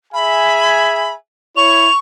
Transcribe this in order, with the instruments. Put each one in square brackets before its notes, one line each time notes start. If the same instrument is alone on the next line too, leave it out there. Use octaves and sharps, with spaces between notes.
[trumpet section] G#4 E5 G#5 [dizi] B5
[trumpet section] E4 C#5 [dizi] C#6 [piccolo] F7